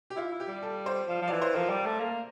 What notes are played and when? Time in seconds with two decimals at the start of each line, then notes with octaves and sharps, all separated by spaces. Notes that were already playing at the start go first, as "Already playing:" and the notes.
0.10 G4
0.16 E4 F4
0.32 E4
0.40 G4
0.47 G3
0.63 A4
0.86 C5
1.08 F3
1.22 F3
1.28 E3 D5
1.41 C5
1.55 F3 A#4
1.70 G3
1.86 A3
2.00 A#3